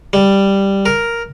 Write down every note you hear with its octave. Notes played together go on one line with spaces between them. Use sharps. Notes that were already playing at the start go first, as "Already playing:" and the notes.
G3
A#4